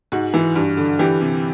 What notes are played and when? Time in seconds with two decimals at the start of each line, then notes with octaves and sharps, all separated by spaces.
0.12 G#2 F#4
0.34 E3
0.56 G2
0.77 D3
0.99 E3 G4
1.21 C3